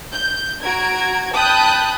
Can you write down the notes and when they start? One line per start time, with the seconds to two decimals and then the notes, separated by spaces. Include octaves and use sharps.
0.14 G6
0.64 F#4 A#5 G#6 D7
1.35 G5 A5 B5 D#6 F#6 G6